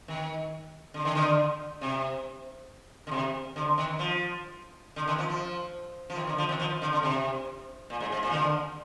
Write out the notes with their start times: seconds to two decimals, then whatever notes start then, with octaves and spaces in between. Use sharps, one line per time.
0.08 D#3
0.94 D3
1.05 D#3
1.15 D3
1.81 C3
3.07 D3
3.11 C3
3.56 D3
3.78 D#3
3.99 F3
4.96 D3
5.08 D#3
5.18 F3
5.30 F3
6.10 F3
6.16 D#3
6.27 D3
6.38 F3
6.49 D#3
6.60 F3
6.82 D3
6.93 D3
7.03 C3
7.90 A#2
8.00 G#2
8.12 G#2
8.23 A#2
8.30 D#3
8.34 D3